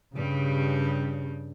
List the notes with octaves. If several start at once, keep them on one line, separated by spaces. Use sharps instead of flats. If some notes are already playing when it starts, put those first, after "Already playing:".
G2 C#3 G3